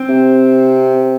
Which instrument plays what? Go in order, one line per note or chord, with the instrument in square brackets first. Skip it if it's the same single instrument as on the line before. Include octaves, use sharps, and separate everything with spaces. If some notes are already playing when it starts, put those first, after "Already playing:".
Already playing: [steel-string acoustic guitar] C4
[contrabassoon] C3